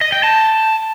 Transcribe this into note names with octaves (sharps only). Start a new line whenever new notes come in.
D#5
G5
A5